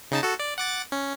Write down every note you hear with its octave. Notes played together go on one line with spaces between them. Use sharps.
C#3 D#4 A5
F#4 A4
D5
F#5 D6 A6
C#4